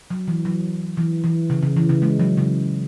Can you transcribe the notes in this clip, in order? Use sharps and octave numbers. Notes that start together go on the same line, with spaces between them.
F#3
E3
F#3
E3
E3
C#3
C#3
E3
C#3
G#3
F#3
C#3